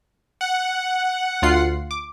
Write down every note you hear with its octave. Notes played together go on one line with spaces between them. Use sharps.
F#5
D2 F4 C7
D6